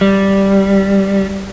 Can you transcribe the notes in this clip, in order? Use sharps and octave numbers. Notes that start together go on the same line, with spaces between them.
G3